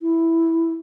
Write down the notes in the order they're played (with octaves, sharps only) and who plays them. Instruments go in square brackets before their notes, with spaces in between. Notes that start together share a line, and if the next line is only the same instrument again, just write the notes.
[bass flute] E4